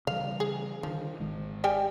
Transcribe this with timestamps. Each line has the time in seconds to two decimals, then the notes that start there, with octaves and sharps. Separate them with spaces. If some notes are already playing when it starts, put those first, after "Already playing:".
0.07 C#3 E3 G3 F5
0.40 G#4
0.83 D3 D#3 F3
1.20 G#1 D#3 G#3
1.64 G3 G5 G#5